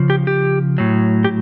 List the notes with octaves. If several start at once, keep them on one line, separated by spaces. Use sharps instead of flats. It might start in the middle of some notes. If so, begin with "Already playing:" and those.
Already playing: C#3 F3
G4
G4
A2 F#3
G4